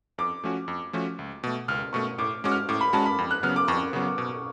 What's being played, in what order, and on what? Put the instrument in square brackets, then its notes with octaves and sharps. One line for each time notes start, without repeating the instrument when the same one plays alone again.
[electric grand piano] F2 [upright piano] D6
[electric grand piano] F3 A3 C#4 F#4
F2
F3 A3 C#4 F#4
C#2
B2 A3
[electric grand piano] C#2 [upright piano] F6
[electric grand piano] B2 A3 [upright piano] C#6
[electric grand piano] A2 [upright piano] D6
[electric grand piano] G#3 C#4 F#4 [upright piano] D6
[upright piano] F6
[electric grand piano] A2 [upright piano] D6
[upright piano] B5
[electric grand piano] G#3 C#4 F#4 [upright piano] A5
[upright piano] B5
[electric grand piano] F2
[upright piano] F#6
[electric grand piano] C#3 F#3 B3 [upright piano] F6
[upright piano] D6
[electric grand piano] F2 [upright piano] C#6
[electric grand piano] C#3 F#3 B3
B2